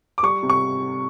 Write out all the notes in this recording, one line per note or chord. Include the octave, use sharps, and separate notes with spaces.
D6
G3 C#6
C3
C#6